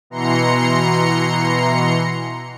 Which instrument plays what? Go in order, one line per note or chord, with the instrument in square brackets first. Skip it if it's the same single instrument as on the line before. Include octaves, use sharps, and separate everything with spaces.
[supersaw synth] B2 E3 A#5 C6 C#7